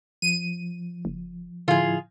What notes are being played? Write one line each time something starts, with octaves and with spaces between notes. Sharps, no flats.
F3 D#7
F#1
A2 D3 F3 E4 F4 G#4